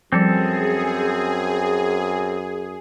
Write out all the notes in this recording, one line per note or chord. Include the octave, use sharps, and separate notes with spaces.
F#2 F3 G3 C4 G#4 A4